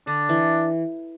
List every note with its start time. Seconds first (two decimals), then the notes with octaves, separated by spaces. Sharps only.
0.07 D3 D4
0.29 E3